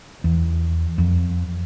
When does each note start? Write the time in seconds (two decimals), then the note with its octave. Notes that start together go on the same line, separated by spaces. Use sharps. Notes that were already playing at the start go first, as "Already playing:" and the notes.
0.24 E2
0.98 F2